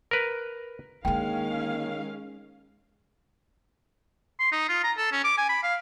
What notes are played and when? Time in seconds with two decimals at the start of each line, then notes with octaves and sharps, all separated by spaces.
0.11 A#4 B4
1.05 D3 D#3 G#3 A#3 C#4 F5 G5
4.40 C6
4.52 D#4
4.69 F4
4.84 A#5
4.97 A4
5.12 C#4
5.24 D6
5.38 G#5
5.49 B5
5.63 F5